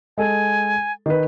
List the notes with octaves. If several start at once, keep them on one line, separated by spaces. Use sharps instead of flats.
G#3 A4 G#5
D#3 B4